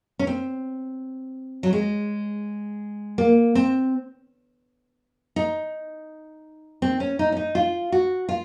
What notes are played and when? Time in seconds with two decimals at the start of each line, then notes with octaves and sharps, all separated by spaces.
0.19 C#4
0.27 C4
1.63 F#3
1.73 G#3
3.18 A#3
3.55 C4
5.36 D#4
6.82 C4
7.00 C#4
7.19 D#4
7.32 C#4
7.37 D#4
7.55 F4
7.92 F#4
8.29 F4